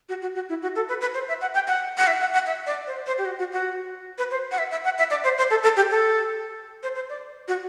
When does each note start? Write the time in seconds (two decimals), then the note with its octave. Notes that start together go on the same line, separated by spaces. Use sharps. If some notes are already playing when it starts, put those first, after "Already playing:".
0.09 F#4
0.22 F#4
0.35 F#4
0.49 E4
0.62 F#4
0.76 A4
0.89 B4
1.01 B4
1.14 C5
1.28 E5
1.41 F#5
1.54 G5
1.68 F#5
1.98 F#5
2.07 E5
2.21 F#5
2.34 F#5
2.47 E5
2.66 D5
2.87 C5
3.06 C5
3.18 G4
3.25 F#4
3.39 F#4
3.52 F#4
4.18 B4
4.31 C5
4.51 F#5
4.58 E5
4.71 E5
4.84 F#5
4.98 E5
5.10 D5
5.24 C5
5.38 C5
5.50 A4
5.63 A4
5.77 G4
5.91 A4
6.83 C5
6.95 C5
7.09 D5
7.48 F#4